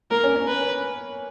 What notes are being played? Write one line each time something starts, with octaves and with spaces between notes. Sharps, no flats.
A#3 A#4
C#4
C#4
B4